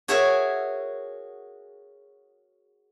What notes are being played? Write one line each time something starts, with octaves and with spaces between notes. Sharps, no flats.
F#4 G#4 A#4 C#5 E5